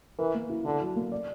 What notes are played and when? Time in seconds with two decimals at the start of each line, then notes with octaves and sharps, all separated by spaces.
0.18 E3 A#4
0.34 A#3
0.50 E4
0.65 D3 E4
0.81 F#3
0.96 A#3
1.12 D5